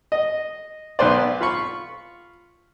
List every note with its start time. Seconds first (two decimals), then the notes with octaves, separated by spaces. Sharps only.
0.12 D#5
0.99 B1 B3 B4 C5 D5
1.41 F4 B5 C#6